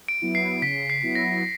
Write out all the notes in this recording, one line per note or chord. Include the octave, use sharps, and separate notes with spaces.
D7
F#3 B3 E4
C7
C#3 B6
C7
F#3 B3 E4
A#6